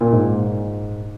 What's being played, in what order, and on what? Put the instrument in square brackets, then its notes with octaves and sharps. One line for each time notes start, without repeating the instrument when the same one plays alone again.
[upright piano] A#2
G#2